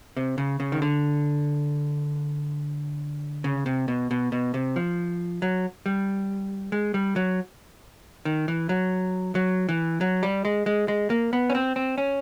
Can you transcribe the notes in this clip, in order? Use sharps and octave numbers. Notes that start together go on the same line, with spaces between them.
C3
C#3
C#3
D#3
D3
C#3
C3
B2
B2
B2
C3
F3
F#3
G3
G#3
G3
F#3
D#3
E3
F#3
F#3
E3
F#3
G3
G#3
G#3
G#3
A#3
B3
C#4
C4
C4
C#4